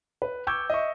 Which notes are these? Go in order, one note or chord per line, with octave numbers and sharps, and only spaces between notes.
B4
C#6 D6 E6 G6 G#6
D#5 E5 C#6